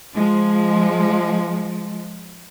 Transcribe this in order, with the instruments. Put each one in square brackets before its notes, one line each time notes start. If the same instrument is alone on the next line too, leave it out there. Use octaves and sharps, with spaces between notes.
[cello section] F3 G#3